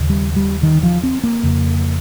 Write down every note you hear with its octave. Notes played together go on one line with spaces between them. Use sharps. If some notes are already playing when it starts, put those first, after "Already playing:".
Already playing: D#2 C#3
G3
G3
D#3
F3
C4
A#3
F2 C#3